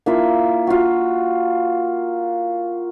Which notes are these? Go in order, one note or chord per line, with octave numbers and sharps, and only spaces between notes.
A#3 E4 F4
F4 F#4